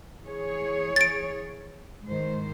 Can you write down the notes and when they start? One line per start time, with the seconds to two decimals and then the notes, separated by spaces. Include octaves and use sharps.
0.24 E3 G#4 C#5
0.96 A6 D7
2.05 G#2 D#3 C5